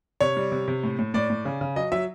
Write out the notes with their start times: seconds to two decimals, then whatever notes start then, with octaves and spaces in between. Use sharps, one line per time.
0.21 C3 C#5
0.37 G3
0.52 C3
0.68 C3
0.83 A2
0.99 A2
1.14 A2 D5
1.30 A2
1.45 C#3
1.61 C#3
1.76 F#3 D#5
1.92 F#3 E5